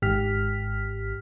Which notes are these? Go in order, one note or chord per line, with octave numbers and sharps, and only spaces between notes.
G#1 G#2 G4 F6 B6